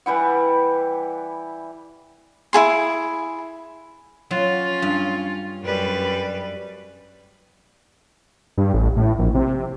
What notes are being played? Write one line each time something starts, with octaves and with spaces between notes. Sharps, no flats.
E3 G3 E4 F#5
E4 F#4 G#4 C6
F#3 C#4 F4
G2
F#2 G3 B4
G2
A1
A2
A#1
C3